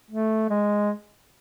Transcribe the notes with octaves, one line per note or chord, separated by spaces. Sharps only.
A3
G#3